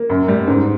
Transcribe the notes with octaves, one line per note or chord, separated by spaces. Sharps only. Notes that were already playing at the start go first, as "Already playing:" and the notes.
Already playing: A#3
F#2
G3
G#2